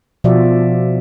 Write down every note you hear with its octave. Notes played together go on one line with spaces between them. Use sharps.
B2 F3 F4 F#4 D5 E5